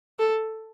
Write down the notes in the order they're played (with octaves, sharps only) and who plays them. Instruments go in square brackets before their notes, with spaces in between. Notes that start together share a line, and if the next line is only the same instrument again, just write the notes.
[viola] A4